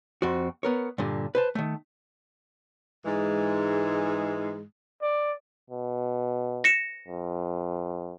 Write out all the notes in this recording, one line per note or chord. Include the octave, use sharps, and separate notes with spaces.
F2 C4 F#4
B3 A#4 C#5
G2 A#2 D3
B4 C5 A5
D#3 A3
G#2 E3 G#3
D5
B2
A#6 C#7 E7
F2